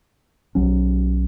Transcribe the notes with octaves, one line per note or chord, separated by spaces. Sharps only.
B1 F#3 C#4